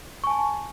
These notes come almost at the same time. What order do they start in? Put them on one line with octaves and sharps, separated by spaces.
C#6 G#5 A5